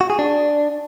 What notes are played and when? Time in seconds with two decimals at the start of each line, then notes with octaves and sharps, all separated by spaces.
0.01 F#4
0.10 G#4
0.19 D4